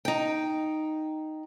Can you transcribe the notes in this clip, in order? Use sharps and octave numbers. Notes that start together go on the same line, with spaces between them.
D#4 G5